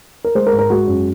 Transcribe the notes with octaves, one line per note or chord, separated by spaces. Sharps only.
A#4
G#3 C5
A#4
G#2
A#4
G#3 F#4
F#2